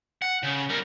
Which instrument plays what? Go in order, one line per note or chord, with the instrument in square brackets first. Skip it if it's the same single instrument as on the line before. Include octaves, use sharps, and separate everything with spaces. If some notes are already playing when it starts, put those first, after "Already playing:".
[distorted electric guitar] F#5
C#3
G3 A#4